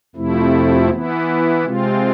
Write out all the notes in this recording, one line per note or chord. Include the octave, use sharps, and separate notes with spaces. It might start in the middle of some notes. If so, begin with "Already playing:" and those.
F2 C3 F3 A3 E4
E3 B3 E4
C3 G#3 C4 F4